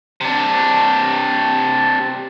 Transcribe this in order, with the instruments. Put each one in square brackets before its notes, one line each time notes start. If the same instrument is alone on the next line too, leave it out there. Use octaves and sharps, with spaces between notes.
[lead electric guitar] C3 D4